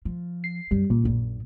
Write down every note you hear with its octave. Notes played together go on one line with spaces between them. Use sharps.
F3
C7
F#2 G3
A#2 C#3
A#1 F#2